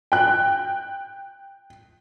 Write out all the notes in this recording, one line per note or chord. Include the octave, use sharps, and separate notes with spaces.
G5 F#6